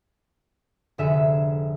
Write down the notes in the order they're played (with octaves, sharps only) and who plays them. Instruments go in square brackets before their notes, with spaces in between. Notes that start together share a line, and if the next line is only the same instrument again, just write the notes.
[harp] F1 D3 G#4 E5 E7